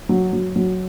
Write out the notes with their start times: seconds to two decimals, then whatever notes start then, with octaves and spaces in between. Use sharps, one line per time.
0.09 F#3
0.33 F#3
0.56 F#3